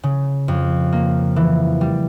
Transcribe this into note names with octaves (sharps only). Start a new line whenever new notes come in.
C#3
F2
A#3
E3
G3